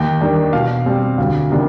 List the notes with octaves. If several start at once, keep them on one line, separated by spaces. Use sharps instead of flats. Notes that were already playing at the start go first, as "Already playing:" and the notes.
Already playing: D#2 G5
D#3 G3 D4
B2 F5
G3 C4
D2 F5
C3 D#3 B3 D4